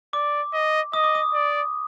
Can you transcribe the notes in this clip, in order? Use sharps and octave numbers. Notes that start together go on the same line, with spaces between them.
D5 D6
D#5
D#5 D#6
D6
D#6
D5